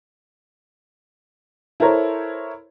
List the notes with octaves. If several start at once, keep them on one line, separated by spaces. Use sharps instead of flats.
E4 A4 A#4 C5 C#5 A#5